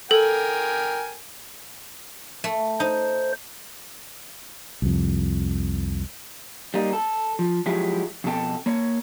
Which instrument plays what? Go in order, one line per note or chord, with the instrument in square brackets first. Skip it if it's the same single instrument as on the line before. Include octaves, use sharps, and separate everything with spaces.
[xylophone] A4 [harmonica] A#4 G5 G#5
[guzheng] A3
[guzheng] D#4 [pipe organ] C5
[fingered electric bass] C2 F2
[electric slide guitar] G3 A#3 D#4
A4
F3
F3 F#3 G#3 E4 G4
F2 B2 A4 G5
A#3 C#5